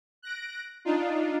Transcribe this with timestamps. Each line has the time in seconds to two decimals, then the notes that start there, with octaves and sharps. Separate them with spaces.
0.22 F#6 A#6 D7
0.85 D4 D#4 F4